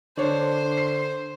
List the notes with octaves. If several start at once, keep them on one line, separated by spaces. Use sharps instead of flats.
D3 D4 C5 C#5
C7